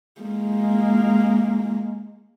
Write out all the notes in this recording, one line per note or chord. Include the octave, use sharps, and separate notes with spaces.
G#3 A#3